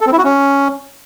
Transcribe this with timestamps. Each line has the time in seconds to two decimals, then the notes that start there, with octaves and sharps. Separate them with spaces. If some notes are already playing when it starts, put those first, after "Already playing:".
0.01 A4
0.07 C4
0.12 E4
0.18 F#4
0.24 C#4